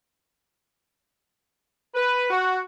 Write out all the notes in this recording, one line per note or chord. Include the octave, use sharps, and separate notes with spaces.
B4
F#4